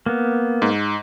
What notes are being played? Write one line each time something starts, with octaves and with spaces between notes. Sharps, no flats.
A#3 B3
G#2